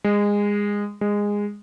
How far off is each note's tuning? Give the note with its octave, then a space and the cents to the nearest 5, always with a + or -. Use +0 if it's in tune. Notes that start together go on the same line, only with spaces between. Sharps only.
G#3 -20
G#3 -15